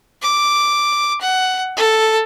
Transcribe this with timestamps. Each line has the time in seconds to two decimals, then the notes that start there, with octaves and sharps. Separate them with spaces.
0.22 D6
1.21 F#5
1.77 A4